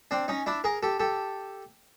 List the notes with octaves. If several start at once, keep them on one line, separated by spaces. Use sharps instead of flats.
C4 D4
C#4 D#4
D4 E4
G#4 A#4
G4 A4
G4 A4